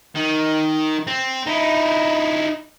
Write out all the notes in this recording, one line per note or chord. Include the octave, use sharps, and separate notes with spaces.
D#3
C4
D#4 E4